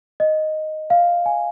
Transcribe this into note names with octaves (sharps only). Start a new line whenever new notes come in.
D#5
F5
G#5